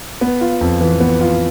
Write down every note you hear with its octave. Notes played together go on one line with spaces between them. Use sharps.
B3
F4
F2
E3
B3
F4